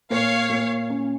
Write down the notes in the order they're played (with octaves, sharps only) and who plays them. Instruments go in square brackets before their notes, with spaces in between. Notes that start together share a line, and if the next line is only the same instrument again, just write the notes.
[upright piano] A#2 [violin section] C#5 F5
[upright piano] A#2
C#4